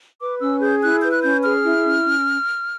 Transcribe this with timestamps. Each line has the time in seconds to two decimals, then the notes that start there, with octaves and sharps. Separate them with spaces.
0.21 B4 D6
0.40 C#4 E6
0.61 G#4 G6
0.82 E4 F#6
1.02 B4 G6
1.12 F#6
1.22 C#4 G6
1.43 G#4 F6
1.64 E4
1.84 C#4
2.05 C#4